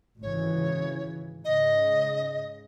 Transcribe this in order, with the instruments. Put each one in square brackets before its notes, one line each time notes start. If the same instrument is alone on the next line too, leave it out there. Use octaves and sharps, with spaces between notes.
[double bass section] G#1 C#3 E3 [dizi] C#5
[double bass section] G#2 C#3 [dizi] D#5